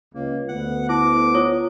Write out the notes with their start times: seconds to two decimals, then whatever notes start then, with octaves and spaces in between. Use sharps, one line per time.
0.15 C#2 A#3
0.49 D2 B3 F#5
0.89 E4 D6
1.34 F4 C#5 D#6